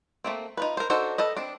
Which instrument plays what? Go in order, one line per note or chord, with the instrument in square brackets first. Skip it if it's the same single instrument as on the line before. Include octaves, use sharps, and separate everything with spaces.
[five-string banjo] A3 A#3 C4
D#4 F4 B4
A#4 C5
D4 D#4 F#4 A4 C5
A4 B4 D#5
C4 D4